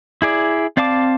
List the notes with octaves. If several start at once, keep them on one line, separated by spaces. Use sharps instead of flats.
E4 G#4 D5
C4 D5 F5 A5 D6